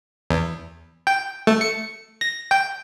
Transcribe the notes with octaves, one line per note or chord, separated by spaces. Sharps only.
E2
G5
A3
C#7
A#6
G5